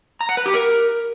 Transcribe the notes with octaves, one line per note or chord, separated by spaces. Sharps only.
A#5
F#5
B4
G4
A#4